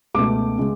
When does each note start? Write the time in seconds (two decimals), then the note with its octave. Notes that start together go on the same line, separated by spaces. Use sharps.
0.14 C#2 B2 A3 D6
0.58 C#3 G#3